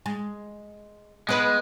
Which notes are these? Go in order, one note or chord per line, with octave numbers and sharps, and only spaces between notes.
G#3
G#3 B3 B4